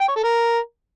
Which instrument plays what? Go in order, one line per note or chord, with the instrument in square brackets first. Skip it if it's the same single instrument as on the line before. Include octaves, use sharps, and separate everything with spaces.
[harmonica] G5
C#5
A4
A#4